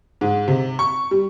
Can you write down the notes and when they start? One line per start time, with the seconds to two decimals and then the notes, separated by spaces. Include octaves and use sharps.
0.21 G#2
0.48 C3
0.79 C#6
1.11 G3